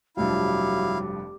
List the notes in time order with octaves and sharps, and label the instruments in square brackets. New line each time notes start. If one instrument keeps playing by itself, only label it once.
[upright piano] F1 G2 F3 [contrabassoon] F#3 [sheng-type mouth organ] E4 F5 [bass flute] G4